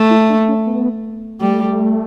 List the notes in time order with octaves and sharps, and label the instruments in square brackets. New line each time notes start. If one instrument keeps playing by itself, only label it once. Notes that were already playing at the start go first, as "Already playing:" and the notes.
Already playing: [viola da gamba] A3
[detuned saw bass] E4
D4
C#4
B3
[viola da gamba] G3 [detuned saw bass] A3